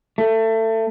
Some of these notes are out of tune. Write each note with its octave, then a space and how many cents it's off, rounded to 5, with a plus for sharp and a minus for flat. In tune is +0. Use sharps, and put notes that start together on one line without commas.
A3 +25